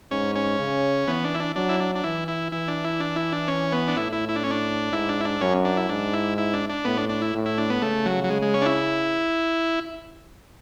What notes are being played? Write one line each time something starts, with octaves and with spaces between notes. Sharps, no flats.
G#2 C#4
C#4
C#3
E3 B3
D4
E4
D4
F#3 D4
E4
D4
D4
E3 E4
E4
E3 E4
D4
E4
D4
E4
D4
C#4
B3
D4
A2 E4
E4
E4
D4
C#4
D4
G#2 E4
D4
E4
D4
F#2 C#4
D4
E4
G#2 D4
E4
E4
D4
D4
A2 B3
D4
D4
E4
A2
E4
D4
B3
C#3 A3
F#3
F#3
G#3
G#3
C#4
D4
E4